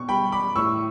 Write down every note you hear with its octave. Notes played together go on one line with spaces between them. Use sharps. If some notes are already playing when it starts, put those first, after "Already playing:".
Already playing: B2 C#6
G3 G5 B5
B5 D6
A2 C#6 E6